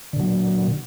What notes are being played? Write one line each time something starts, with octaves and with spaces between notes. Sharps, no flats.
A#2 D3 F#3